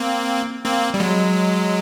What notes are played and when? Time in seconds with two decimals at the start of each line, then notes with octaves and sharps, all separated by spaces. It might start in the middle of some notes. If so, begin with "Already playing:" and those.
Already playing: A#3 C4
0.64 A#3 C4
0.94 G3
1.00 F#3 G#3